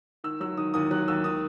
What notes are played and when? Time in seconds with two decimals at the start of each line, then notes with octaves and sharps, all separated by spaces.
0.24 D#3 E6
0.40 F#3 E6
0.57 D#3 D#6
0.74 D#2 D#6
0.91 F#3 F#6
1.08 D#2 E6
1.24 D#3 D#6